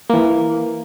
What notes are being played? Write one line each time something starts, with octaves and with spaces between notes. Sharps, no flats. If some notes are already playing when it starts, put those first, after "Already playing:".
E3 A#3